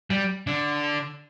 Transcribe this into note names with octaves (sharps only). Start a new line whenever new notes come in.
G3
D3